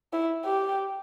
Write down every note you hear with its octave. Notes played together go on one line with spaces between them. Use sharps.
E4
G4